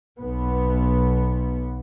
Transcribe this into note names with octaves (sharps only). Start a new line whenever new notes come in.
B1 B3